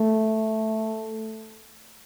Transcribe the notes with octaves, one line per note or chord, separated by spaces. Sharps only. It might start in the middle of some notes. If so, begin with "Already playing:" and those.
Already playing: A3